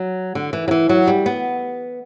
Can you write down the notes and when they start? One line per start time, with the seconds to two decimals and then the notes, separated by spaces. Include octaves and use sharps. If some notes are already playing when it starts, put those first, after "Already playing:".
Already playing: F#3
0.35 D3
0.53 E3
0.68 F#3
0.71 E3
0.89 F#3
1.07 G3
1.26 B3